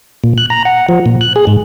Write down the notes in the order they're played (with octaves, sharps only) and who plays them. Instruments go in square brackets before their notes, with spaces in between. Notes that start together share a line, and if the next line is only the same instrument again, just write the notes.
[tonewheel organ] A#2
F#6
A#5
F#5
F3
A#2
F#6
G#4
G#2